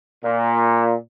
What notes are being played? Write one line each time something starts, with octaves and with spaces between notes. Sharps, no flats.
A#2